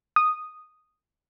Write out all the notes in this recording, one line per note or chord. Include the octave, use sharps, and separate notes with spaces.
D#6